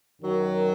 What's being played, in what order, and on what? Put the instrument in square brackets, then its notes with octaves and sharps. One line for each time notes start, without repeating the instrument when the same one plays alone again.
[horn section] F#2 D#3 F#3